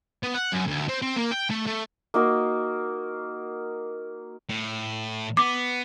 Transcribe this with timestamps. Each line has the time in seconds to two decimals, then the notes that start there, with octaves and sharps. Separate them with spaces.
0.23 B3
0.35 F#5
0.53 F#2
0.67 D2
0.88 C4
1.02 C4
1.16 A#3
1.32 G5
1.51 A3
1.67 A3
2.14 A#3 D#4 F#4 F5
4.49 A2
5.37 B3 D6